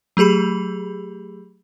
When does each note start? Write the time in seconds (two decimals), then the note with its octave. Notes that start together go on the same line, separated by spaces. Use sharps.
0.17 F#3 A3 G4 G#4 B5